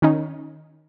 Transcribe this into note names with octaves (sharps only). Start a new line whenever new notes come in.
D#3 C#4 D#4